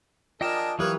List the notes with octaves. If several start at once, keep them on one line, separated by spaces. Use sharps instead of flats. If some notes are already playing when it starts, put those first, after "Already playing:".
D4 F4 G#4 A#4 D#5 G5 A5
E3 F#3 G4 A#4 B4 C#5 F5 D#6